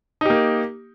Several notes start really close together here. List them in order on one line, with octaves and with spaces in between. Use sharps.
D#4 G4 A#3